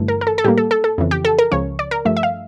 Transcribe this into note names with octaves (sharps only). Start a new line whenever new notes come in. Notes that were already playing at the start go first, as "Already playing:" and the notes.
Already playing: G1 G2 E3 A3
A#4
A#4
A4
A4
A2 G3 A#3 G4
A4
A4
A4
F2 C#3 E3
G4
A4
A#4
C#2 C#3 F3 C#4 C#5
D5
A#4
G2 F3 A3 E5
E5
F5